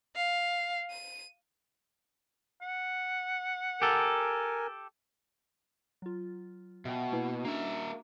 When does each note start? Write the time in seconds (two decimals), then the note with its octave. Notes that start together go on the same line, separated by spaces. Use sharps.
0.16 F5
0.91 D#7
2.61 F#5
3.82 G4 A4 A#4 G#5
6.02 F#3 F4
6.85 B2 E5 G5
7.12 A#3 E4 B4
7.45 A#3 C#4 D4 F#4 E5